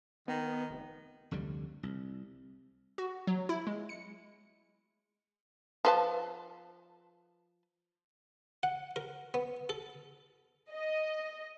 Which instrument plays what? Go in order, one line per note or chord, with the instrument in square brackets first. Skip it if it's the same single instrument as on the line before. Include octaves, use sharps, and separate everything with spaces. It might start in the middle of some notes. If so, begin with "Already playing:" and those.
[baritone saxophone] D#3 [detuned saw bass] B3
[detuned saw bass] F1
[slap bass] F1 D2 D3 G3
C2
[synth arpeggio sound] F#4
F#3
E4
G#3
C#7
[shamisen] F3 B4 A5
[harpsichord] F#5
A#4
B3
A4
[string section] D#5